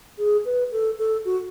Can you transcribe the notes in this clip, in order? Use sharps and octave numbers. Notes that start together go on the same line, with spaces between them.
G#4
B4
A4
A4
F#4